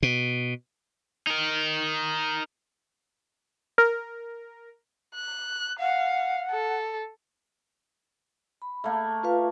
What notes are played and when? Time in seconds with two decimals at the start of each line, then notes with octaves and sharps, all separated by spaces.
0.03 B2
1.27 D#4 A#4
3.78 A#4
5.15 F#6
5.80 F5 F#5
6.51 A4
8.62 B5
8.84 A3 A#3
9.23 F4 B4 F5